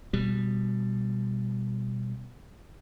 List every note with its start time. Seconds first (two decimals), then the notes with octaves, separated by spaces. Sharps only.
0.13 B2 G3